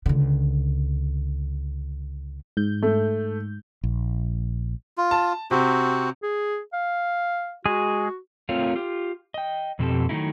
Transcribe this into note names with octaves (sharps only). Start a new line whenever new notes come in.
C#2 D3
G#2 G6
A3
A#1
F4
A5
C3 C4 F#4
G#4
F5
G#3 F#4 G#4
A3 C4 F4 A#4 C#5 F5
F4 G4
D#5 G5
F2 B2 C4 G4 A4
D#3 E3 F#3 A3 D#4 E4